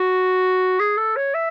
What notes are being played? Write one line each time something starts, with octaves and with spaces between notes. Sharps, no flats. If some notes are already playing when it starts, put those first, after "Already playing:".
Already playing: F#4
G#4
A4
C#5
E5